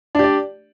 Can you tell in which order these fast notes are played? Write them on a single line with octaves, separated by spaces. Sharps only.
D4 G4 D5